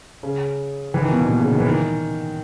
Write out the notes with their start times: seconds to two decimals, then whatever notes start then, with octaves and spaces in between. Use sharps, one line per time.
0.23 C#3
0.94 E3
1.02 D#3
1.11 B2
1.20 A#2
1.28 B2
1.40 C#3
1.52 D#3
1.60 E3
1.67 D#3